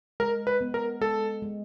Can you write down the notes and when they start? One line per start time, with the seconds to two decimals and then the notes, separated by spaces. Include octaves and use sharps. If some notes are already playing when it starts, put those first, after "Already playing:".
0.20 G#3 A#4
0.47 B4
0.61 B3
0.74 A#4
1.01 G#3 A4
1.42 G#3